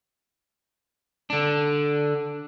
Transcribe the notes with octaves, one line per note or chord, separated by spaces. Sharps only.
D3 D4